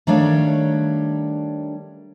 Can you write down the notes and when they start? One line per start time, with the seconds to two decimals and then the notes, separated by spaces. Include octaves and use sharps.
0.07 D#3 G3 A3 D4 C#5 F5